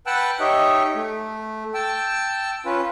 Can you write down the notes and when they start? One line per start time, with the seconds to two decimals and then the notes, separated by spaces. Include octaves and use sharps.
0.06 B4 F#5 G5 A5 E6 F#6
0.40 D#4 G4 C#5 D#5 E5
0.95 A3
1.74 G5 A5 E6
2.65 C#4 F4 B4